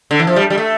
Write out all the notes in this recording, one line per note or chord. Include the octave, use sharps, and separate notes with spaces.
D3
E3
F3
G3
G3
A3